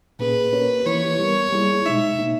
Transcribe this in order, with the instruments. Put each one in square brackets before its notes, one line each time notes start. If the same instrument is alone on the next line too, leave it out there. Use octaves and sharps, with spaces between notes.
[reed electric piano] A#2 A#3 C#4 G#4 [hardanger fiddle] B4
[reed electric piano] A#3 C#4 G4 A#4 C#5
[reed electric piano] E3 A#3 E4 G4 [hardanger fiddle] C#5
[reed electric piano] G3 B3 G4 A#4
G3 A#3 E4 G#4
[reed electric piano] B2 G#3 D#4 [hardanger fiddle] E5
[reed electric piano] B2 A#3 D#4